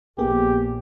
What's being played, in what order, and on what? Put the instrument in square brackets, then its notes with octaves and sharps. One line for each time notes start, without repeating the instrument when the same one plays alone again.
[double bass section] A#1 [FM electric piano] A#3 B3 G#4 [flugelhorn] G4